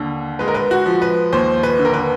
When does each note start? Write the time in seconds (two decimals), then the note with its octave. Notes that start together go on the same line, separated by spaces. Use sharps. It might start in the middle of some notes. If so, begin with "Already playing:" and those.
Already playing: D#2 D3
0.39 G#3 B4
0.48 A#4
0.54 B4
0.71 F#4
0.86 F3
1.02 B4
1.33 D#2 C5
1.63 B4
1.79 D3
1.85 A#4
1.94 B4